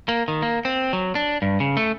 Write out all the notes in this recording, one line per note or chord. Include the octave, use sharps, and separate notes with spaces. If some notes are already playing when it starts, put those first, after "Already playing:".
A#3
D#3
A#3
C4
F#3
D4
G2
C#3
A3